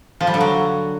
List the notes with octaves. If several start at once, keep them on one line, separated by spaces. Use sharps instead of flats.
F3
G3
D3
F#3